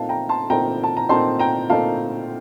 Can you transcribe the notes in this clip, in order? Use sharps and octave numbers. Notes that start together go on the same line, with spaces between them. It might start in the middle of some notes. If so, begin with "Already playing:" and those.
Already playing: A#2 A3 C4 D#4 F5 A5
G5 A#5
A5 C6
A#2 A3 C4 D#4 G5 A#5
A5
A#5
A#2 A3 C4 D#4 A5 C6
G5 A#5
A#2 A3 C4 D#4 F5 A5